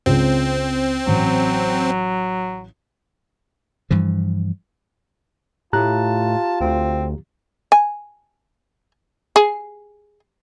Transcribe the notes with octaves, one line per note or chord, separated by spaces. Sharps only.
C#2 C4
A1 F#3
G2 E3 F3
A2 F4 G4 A5 A#5 F#6
D2 C4
G#5
G#4